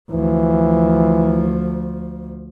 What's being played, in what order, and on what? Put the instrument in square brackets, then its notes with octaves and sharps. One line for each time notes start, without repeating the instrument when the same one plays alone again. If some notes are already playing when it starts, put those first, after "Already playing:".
[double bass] D2 F3 [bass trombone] E3